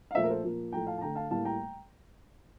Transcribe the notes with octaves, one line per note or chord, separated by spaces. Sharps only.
F5
A#2 F3 A3 C5 E5
A#4
A4 C5
A#2 F3 A#3
A2 F3 A3 G5 A#5
F5 A5
A5
D3 A3 G5 A#5
F5 A5
A2 G3 A#3 F5 A5
G5 A#5